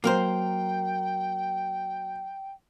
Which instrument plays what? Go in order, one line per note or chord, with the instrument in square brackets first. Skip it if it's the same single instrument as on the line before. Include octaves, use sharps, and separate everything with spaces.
[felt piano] F#3 [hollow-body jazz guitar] A#3 A#4 C5 [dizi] G5